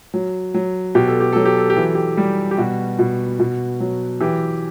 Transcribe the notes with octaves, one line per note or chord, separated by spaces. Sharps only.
F#3
F#3
B2 G4
A4
G4
F#3 A4
G4
A4
G4
E3
A4
G4
G3
G4
B2 F#4
B2
B2
F#3
E3 G4